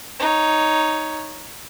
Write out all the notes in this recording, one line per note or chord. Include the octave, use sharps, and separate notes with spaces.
D#4 C#5